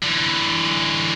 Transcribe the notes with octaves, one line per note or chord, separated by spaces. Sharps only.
D3 E3